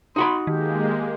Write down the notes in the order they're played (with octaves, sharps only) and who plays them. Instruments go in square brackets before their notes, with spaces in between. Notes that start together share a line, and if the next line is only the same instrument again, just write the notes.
[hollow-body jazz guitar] D#4 F#4 B5 [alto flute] C6
[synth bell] D#3 [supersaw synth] G#3 A#3 [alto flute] G4